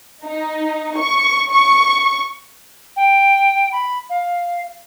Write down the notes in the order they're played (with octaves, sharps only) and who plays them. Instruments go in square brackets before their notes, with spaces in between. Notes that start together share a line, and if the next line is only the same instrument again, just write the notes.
[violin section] D#4
C#6
C#6
[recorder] G5
B5
F5